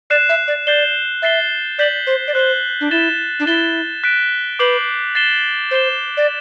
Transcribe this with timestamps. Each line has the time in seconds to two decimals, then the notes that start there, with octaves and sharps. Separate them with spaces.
0.10 D5 F#6 C7 E7
0.29 E5
0.48 D5
0.67 D5 G6 C7 G7
1.22 E5 A6 C7 G7
1.79 D5 G6 B6 F#7
2.07 C5
2.28 D5
2.34 C5 F#6 C7 G7
2.81 D4
2.91 E4 A6 E7 G7
3.40 D4
3.47 E4 A6 E7 G7
4.04 F#6 B6 D7
4.59 B4 D6 G6 C7 F#7
5.15 A6 C7 E7 G7
5.71 C5 G6 C7 E7 G7
6.17 D5